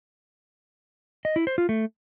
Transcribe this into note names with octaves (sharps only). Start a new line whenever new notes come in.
D#5
E4
C5
F4
A3